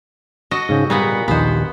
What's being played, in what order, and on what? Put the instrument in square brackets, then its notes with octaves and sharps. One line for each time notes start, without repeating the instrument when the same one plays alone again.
[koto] F#4 A4 D#5
[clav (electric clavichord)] G#2 C#3 G5
[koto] A#2 B3 F#5 [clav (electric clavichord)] G3
[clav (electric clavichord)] A#1 D#2 D#5 [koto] B3 C5